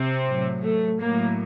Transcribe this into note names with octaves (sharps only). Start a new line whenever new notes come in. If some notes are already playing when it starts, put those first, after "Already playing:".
Already playing: C3 C4
A2 F#3
A3
A2 F#3 A#3